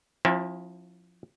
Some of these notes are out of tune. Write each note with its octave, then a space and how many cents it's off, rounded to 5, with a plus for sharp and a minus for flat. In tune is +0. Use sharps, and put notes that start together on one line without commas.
F3 +20 C#4 -45 E4 +0